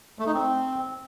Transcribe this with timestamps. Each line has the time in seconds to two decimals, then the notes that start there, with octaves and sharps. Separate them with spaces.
0.19 A3
0.26 D#4
0.34 C4